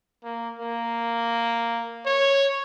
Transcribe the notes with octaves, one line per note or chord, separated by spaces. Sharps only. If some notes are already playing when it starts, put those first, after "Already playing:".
A#3
A#3
C#5